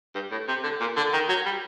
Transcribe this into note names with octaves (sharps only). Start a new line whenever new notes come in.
G2
A2
C3
D3
A#2
D3
D#3
F#3
G3